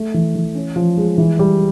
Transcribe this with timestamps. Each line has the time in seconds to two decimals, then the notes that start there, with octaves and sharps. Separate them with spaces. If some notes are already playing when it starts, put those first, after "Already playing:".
Already playing: A3
0.14 E3
0.35 E3
0.55 C#4
0.76 F3
0.97 G#3
1.18 E3
1.39 G3